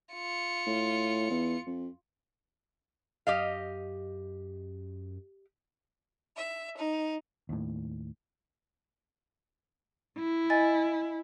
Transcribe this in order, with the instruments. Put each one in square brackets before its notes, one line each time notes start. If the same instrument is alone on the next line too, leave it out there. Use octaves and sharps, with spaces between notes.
[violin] F4 C#7
[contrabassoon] A2
E2
F2
[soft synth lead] F#2 [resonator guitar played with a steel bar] G4 D#5 F5
[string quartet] E5
D#4
[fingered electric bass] D#2 A2
[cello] E4
[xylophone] D#5 G#5 A6